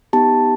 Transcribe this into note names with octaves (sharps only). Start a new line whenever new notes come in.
B3 D#4 G4 A5